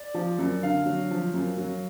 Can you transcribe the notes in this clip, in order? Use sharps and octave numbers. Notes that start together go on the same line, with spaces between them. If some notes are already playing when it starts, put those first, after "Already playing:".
Already playing: D5
F3
F#2
D3 F5
F#3
F3
F#2
F#3